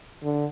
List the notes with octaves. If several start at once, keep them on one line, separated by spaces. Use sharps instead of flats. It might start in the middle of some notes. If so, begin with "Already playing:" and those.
D3